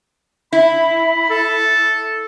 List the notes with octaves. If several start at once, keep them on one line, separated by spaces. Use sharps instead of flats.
E4 B5
A4